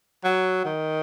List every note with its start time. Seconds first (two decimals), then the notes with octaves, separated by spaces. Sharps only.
0.24 F#3
0.65 D#3